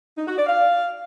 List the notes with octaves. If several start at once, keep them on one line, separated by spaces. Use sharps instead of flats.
D#4
F#4
D5
F5